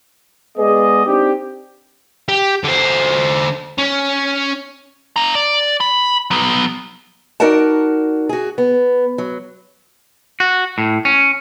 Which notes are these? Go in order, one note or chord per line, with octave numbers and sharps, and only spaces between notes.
G#3 B3 G#4 B4 D5 D#5
C4 D4 D#4 G4
G4
D3 C5
C#4
D4 A#5
D5
B5
F#3 B3
D#4 F#4 A#4 D5 F#5 A5
F#4 G#4
B3
F#3
F#4
A2
C#4